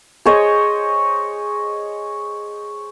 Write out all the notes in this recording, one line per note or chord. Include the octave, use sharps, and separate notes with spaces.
G#4 C5 C#5 D#5